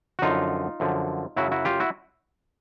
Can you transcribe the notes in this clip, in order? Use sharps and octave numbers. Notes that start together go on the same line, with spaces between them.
F#4
F#2 D3 F3 D#4 F4
F#2 D3 F3
F#2 C#3 F#3 E4 F#4
E4 F#4
F4 G4
E4 F#4